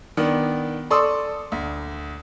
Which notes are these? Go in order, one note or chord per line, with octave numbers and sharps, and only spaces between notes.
D#3 B3 D4
A4 D5 C6 C#6 D#6 E6
D2